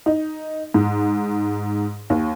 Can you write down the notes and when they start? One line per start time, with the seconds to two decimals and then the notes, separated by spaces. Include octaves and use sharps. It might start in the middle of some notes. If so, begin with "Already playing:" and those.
0.06 D#4
0.74 G#2
2.10 D#2